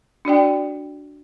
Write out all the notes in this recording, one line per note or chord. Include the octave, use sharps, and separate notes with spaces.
D4 F#4 D5 G5